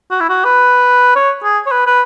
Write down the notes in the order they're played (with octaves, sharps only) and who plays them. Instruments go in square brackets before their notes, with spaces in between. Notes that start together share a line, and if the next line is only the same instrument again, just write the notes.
[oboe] F#4
E4
F#4
B4
C#5
G#4
C#5
B4
B4